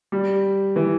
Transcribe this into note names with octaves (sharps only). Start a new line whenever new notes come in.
G3
E3